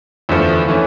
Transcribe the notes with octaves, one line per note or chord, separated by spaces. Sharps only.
E2 D3 F3 A3
E3 A3 C#4